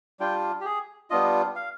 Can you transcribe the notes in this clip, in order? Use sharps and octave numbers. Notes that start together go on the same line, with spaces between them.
G3 D4 F4 G5
G4
G#4
G3 B3 D4 F4 D#5
F5